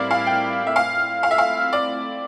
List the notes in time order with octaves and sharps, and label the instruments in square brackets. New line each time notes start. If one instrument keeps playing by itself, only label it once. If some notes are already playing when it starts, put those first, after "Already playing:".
Already playing: [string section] A2 G3 C4 E4 A#4 [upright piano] D5 F5
[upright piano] F5
G5
E5
[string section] A3 C4 E4 [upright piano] F5
[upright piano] F5
E5
F5
D5